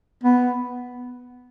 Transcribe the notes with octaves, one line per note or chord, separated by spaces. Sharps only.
B3